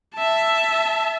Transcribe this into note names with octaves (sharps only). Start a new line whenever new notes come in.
E5 A5